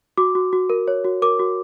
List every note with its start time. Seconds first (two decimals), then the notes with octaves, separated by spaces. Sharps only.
0.17 F#4 D6
0.35 F#4
0.53 F#4
0.70 A#4
0.88 C#5
1.05 F#4
1.22 A#4 D6
1.40 F#4